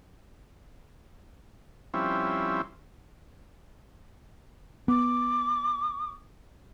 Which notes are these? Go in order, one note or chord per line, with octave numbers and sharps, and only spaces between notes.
F3 G3 C4 C#4 E4
B3 D6